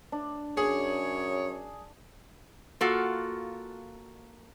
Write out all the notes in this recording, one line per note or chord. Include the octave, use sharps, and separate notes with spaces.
D4
F#2 G#4 C#5
A#3 F4 F#4 A4